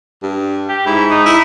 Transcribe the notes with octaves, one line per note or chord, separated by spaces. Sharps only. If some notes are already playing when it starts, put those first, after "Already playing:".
G2
G4
G#2 E4
D#4
E4